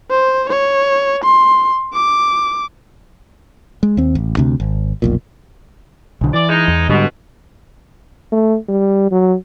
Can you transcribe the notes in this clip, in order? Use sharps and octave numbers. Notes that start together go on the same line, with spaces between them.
C5
C#5
C6
D6
G#3
D#2 C4
A1
D2 C3
G#1
F1 B1 A#2
B1 D3
E3 D5
G#3 D#4
E2
G#2 B2 D3 G3
A3
G3
F#3